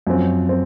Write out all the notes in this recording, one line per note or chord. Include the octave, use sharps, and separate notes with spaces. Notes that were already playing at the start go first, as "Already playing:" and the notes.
F#2 F3 C4
C4